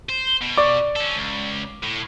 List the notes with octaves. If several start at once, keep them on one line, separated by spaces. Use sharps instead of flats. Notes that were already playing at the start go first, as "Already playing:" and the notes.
C5
B2
D5 C#6 D6
C#4 A4
C#2
A2